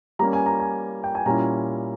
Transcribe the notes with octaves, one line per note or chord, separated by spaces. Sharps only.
G3 A#3 C#4 A#5
G#5
A#5
G#5
G5
G#5
A#2 G3 C#4 E4 A#5